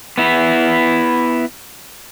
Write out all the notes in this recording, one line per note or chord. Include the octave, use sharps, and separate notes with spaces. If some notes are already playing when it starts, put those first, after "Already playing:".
B3 E4